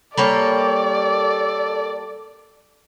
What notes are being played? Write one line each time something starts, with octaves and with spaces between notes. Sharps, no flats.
G3 A#3 A4 C#5 D5